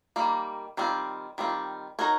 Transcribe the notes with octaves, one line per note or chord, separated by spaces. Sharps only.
D#3 G3 A#3
D#3 G3 C4 F4
D#3 G3 C4 F4
D#4 F#4 A#4 C#5